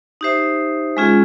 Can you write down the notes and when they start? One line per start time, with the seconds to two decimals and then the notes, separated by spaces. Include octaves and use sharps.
0.21 D#4 G4 C5 E5
0.97 G#3 C#4 F4 G#4